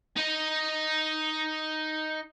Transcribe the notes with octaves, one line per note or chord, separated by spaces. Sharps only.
D#4 D#5